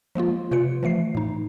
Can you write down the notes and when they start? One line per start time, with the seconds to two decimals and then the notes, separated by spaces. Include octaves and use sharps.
0.15 F3 G#3 A#3 F4
0.51 C3 F4 B4 C#7
0.83 E3 F3 A3 C7
1.15 A2 D#4